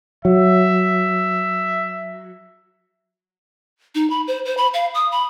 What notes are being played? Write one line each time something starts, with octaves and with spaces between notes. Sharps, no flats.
F#3 E5
D#4
B5
C5
C5
B5
F5
D#6
B5